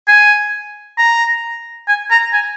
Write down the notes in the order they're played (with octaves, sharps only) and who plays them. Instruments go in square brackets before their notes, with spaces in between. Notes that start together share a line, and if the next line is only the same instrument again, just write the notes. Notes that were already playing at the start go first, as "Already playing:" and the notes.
[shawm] G#5
A#5
G#5
A#5
G#5